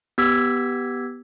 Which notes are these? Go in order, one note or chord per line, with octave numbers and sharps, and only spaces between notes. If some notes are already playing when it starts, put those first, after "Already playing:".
B3 G4 E6 G#6 B6